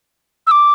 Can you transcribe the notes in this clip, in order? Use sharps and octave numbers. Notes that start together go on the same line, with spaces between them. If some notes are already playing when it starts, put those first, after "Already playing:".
E6
D6